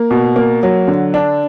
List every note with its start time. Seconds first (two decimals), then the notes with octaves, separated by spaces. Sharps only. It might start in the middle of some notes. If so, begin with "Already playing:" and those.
Already playing: A#3
0.11 B2
0.36 A#3
0.63 F#3
0.88 D3
1.14 D4